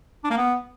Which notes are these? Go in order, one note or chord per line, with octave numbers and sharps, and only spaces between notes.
D4
A#3
B3